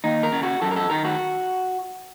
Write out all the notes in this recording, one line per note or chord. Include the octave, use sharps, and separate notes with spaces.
D#2 D#4
A#4
C#3
F#4
F#2 A4
A#4
A4
D#3 A#4
F#4